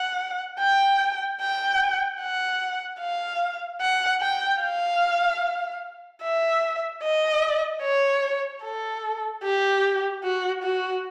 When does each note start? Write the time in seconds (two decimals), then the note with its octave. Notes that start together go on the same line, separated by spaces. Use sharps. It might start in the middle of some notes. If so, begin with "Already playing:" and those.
Already playing: F#5
0.60 G5
1.41 G5
2.21 F#5
3.01 F5
3.81 F#5
4.21 G5
4.62 F5
6.23 E5
7.03 D#5
7.82 C#5
8.64 A4
9.43 G4
10.24 F#4
10.63 F#4